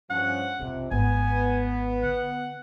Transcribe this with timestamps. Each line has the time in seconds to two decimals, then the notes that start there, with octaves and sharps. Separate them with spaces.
0.10 G2 F3 C#4 F#5
0.59 B1 F2 C3 C#4
0.91 G#1 B3 G#5
2.03 D3 F#5